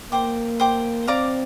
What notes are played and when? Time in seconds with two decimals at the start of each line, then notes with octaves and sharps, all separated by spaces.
0.11 A#3 C5 G5 D6
0.60 C5 G5 D6
1.07 C4 D5 F5 A#5 D6